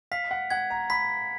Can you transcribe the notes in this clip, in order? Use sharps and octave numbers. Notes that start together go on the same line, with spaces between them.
F5 B6
F#5
F#5 G#6
A#5
B5 B6